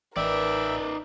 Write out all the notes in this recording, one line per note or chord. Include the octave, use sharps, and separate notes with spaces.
A1 D#4 A#4 B4 D5 E5 G5